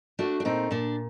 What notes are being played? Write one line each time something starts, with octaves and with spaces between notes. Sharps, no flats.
A3 D4 F#4
D4
A#2 C4 D#4
A#2 D4